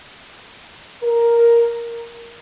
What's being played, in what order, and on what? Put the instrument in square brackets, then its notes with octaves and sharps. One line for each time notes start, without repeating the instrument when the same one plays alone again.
[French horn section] A#4